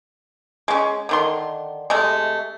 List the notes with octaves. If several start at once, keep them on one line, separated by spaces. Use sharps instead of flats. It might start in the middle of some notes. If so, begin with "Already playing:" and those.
G#3 C#4
D3 D#3 C6
C3 G#3 A3